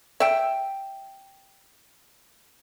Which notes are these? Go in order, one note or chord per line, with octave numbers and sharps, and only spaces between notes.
E5 G5